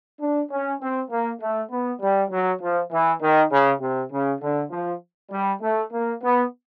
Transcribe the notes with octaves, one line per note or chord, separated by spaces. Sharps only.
D4
C#4
C4
A#3
A3
B3
G3
F#3
F3
E3
D#3
C#3
C3
C#3
D3
F3
G3
A3
A#3
B3